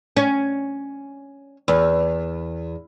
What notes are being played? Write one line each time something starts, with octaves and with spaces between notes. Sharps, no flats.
C#4
E2